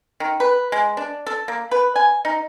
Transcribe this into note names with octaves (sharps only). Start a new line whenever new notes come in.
D#3
B4
G#3
D4
A4
A#3
B4
G#5
D#4